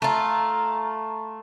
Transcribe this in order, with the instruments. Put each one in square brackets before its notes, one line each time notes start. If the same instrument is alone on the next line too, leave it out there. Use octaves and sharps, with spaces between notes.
[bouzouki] A3 F4 [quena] A#5